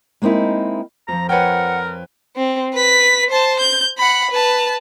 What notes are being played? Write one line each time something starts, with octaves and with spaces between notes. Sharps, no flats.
G#3 A#3 C4 D#4 E4
F2 F3 A#5
A#4 B4 C#5 F#5 G5
C4
B4 B6
C5 A5
G6
F#5 B5
B4 A5